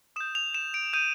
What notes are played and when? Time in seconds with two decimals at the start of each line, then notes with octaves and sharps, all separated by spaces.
0.16 D#6 G6 E7
0.35 F7
0.55 E7
0.74 D7
0.93 D#6 G6 D#7